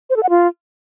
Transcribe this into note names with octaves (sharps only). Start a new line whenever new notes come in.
C5
A4
F#5
F4